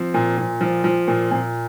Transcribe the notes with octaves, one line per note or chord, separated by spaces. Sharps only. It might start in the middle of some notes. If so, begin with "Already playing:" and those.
Already playing: F3 C4
A#2
A#2
F3
F3
A#2
A#2 C4